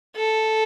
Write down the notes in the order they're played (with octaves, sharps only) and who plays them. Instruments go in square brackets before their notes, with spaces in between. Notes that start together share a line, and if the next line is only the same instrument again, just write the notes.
[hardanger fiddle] A4